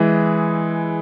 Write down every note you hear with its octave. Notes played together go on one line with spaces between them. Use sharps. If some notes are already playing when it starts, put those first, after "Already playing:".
Already playing: E3 G#3 E4 G#4